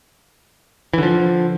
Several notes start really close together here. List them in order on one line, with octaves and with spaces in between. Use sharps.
E3 D3 F3